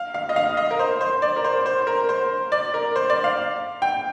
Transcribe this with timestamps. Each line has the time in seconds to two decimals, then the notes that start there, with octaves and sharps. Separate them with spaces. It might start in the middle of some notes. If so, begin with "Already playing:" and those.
Already playing: F5
0.14 F5
0.29 D#5
0.36 F5
0.57 D#5
0.71 A#4
0.79 C5
1.01 C5
1.22 D5
1.36 A#4
1.44 C5
1.66 C5
1.87 A#4
2.09 C5
2.52 D5
2.74 A#4
2.96 C5
3.10 D5
3.24 F5
3.82 G5